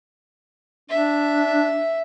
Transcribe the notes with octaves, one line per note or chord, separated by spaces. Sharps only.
D4 E5